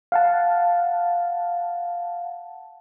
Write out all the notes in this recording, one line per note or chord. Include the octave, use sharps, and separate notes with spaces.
F5 F#5 A5